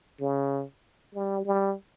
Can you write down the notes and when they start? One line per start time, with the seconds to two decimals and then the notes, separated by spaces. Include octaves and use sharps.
0.20 C#3
1.14 G3
1.45 G3